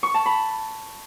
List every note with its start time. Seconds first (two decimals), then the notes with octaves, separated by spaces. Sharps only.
0.03 C#6
0.14 A5
0.26 B5